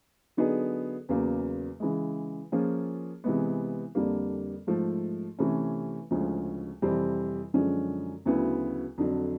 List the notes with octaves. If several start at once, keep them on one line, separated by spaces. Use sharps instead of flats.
D3 F#3 B3 D#4 G#4
E2 C#3 F#3 A#3
C#3 E3 G#3
F3 A#3 C#4 F4 G#4
C3 E3 G#3 B3
F2 D3 G3 A#3
G#2 F3 A3
C3 E3 A3 C#4
D2 C#3 F3 G#3 C#4
F2 C3 E3 G3 C4
F#2 D3 F3 G#3 C#4
D2 C#3 F#3 B3 E4
F2 D3 F#3